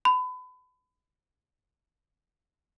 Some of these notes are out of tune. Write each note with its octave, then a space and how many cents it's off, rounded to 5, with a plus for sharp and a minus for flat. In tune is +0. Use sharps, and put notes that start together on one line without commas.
B5 +30